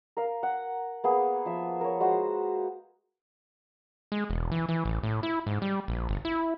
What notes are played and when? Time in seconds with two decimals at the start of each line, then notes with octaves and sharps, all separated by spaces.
0.17 A#4 F5
0.43 F#5
1.04 A#3 B3 G#4
1.46 F3 E5
1.81 A#4 C#5
2.00 G#3 F#4 C5 F#5
4.12 G#3
4.30 E1
4.51 E3
4.69 E3
4.85 A1
5.03 A2
5.23 E4
5.47 G#2
5.62 G3
5.88 A#1
6.09 G1
6.25 E4